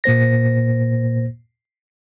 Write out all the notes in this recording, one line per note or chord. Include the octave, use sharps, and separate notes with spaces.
A#2 A#3 C5 A#6